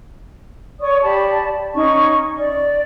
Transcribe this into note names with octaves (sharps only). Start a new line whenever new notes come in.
C#5 D5 C#6 D#6
G4 D5 A5 B5
C#4 D#4 C#6
D5